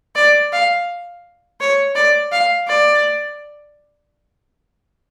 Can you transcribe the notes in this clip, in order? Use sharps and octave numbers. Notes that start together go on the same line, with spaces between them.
D5
F5
C#5
D5
F5
D5